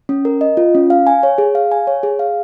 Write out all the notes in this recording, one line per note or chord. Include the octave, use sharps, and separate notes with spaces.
C#4
A#4
D#5
F4
C#4
F5
G#5
C#5
G#4
F5
G#5
C#5
G#4
F5